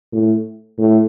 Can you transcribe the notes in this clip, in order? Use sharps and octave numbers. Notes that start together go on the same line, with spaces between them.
A2
A2